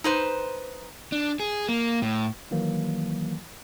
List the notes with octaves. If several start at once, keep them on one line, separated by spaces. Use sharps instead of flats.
D#4 B4 C5
D4
G#4
A#3
A2
D#3 E3 F#3 A#3